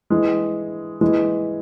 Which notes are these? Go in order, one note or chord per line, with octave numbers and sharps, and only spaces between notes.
E3 G#3
E3 G#3